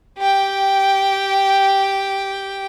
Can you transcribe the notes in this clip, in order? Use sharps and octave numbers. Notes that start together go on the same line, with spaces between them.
G4 G5